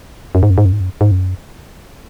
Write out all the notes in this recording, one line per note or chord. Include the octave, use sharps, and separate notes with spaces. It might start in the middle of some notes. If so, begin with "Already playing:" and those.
F#2
G#2
F#2
G#2
F#2
G#2
F#2
G#2
F#2